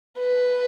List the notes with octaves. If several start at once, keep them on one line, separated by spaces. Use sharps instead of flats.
B4